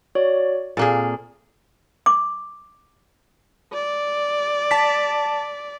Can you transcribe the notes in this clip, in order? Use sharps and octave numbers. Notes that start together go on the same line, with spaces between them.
F#4 C#5 D5
A#2 A#3 C4 G#4 A4 A6
D6
D5
A5 B6